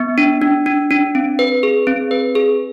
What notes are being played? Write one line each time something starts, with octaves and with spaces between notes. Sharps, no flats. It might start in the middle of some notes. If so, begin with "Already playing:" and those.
Already playing: B3
D4
D4
D4
D4
C4
B4
G#4
C4
B4
G#4